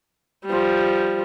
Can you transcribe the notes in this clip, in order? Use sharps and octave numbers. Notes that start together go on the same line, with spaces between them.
F3 G3